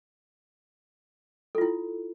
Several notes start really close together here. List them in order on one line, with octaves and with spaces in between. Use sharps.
A4 F4 E4